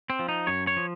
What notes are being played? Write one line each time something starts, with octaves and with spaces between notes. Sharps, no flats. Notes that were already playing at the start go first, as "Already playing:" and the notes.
C4
F3
D#4
F#2 C#5
C#5
F3